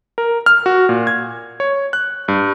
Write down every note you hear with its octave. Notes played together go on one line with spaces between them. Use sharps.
A#4
F6
F#4
A#2
G#6
C#5
F#6
G2